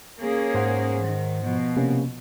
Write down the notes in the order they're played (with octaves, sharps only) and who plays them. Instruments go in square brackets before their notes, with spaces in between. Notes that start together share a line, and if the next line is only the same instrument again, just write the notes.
[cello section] A#3 C#4 G#4
[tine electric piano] G#2 C5 F#5
[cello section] D#3
B2 F3
[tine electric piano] C3 A#3 C#4